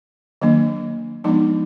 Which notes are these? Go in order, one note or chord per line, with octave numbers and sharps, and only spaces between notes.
D#3 F#3 A#3 D4
F3 G#3 B3 D4 D#4